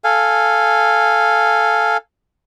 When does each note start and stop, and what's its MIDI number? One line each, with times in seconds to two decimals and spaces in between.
0.04 1.97 69
0.04 1.97 77
0.04 1.97 80